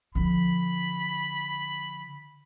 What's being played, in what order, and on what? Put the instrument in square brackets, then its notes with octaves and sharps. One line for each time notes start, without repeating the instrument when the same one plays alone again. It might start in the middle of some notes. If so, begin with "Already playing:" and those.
[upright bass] D3 F3 [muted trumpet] B5